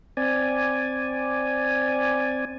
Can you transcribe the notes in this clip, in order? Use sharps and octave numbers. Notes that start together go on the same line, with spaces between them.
C4 D5 G#5